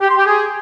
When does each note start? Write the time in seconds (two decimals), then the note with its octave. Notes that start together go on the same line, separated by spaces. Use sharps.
0.01 G4
0.09 C6
0.17 G4
0.26 G#4